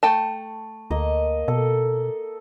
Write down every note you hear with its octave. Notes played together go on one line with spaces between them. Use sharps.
A3 G5 A5
D2 A#3 D#5
B2 A4